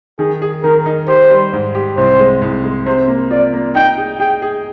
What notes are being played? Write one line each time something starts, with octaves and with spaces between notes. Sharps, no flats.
D#3 G#4
G#4
D#3 A#4
D#4
G4 C5
G3
G#2
G4
C2 C5
G#3
C2
G#3
C3 C5
A#3
F4 D5
A#3
D#4 G5
G#4
G#4 G5
G#4